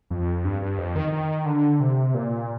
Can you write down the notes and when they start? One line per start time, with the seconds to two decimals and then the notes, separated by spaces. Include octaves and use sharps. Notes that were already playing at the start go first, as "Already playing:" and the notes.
0.10 F2
0.44 G2
0.62 G2
0.78 F2
0.96 D#3
1.13 D#3
1.46 D3
1.80 C3
2.15 A#2